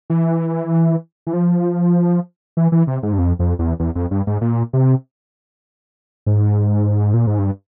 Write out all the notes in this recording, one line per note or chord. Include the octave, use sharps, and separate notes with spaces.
E3
E3
F3
E3
E3
C3
G#2
G2
F2
F2
E2
E2
F2
G2
G#2
A#2
C3
G#2
A#2
G#2
G2